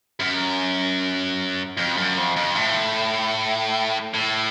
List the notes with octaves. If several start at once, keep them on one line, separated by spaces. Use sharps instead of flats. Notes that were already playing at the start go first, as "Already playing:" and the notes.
F#2
F2
F#2
F2
F2
A2
A2